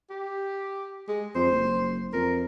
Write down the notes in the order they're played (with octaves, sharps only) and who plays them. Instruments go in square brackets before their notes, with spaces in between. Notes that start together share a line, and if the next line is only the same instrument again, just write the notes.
[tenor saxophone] G4
G#3
[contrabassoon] F2 [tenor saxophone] C5
[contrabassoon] F#1
[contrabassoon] F2 [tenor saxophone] A#4